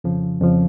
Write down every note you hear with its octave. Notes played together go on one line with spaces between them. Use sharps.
F2 C#3 F3
F2 C#3 F3